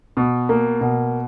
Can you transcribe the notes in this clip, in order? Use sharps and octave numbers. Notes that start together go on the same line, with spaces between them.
B2
A#3
B2